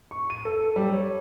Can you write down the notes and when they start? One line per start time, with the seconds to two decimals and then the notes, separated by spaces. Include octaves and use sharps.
0.11 C#6
0.30 D#7
0.45 A4
0.76 G3
0.93 C#5